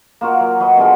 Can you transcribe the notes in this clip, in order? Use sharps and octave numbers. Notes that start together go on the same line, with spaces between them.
A#3 F4 F#4 A#4
F#3
F#3 F#4 B4 D#5
B2 D3 G#3 F4